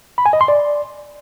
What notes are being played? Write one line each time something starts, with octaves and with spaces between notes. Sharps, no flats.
B5
G#5
D#5
C6
D5